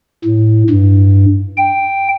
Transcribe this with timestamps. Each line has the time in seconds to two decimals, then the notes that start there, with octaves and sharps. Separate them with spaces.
0.24 A2
0.70 G2
1.58 G5